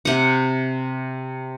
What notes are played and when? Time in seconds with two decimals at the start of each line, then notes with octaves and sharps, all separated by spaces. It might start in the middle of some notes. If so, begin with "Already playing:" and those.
0.05 C3 F#5